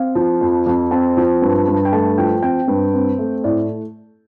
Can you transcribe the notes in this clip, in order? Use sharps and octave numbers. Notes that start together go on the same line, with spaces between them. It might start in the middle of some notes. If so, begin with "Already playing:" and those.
Already playing: C4 F5
F3
F2
F2
C4 A5
F3
G2
G2
G5
A3 A5
F3 G5
C4 G5
G2
C4
A3
A2 D5